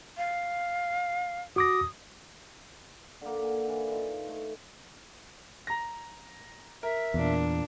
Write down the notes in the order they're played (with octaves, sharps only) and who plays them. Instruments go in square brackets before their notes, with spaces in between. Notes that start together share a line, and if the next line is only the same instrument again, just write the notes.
[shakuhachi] F5
[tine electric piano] F#4 D6 A#6 [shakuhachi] D#6
[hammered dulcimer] D3 A#3
F#5 G#5
D3 E3
D#4 F4 B4 D#5
A3
[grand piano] A#5 A#6
[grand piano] A#4 [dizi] E5
[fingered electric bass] E2 [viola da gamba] A#2 D4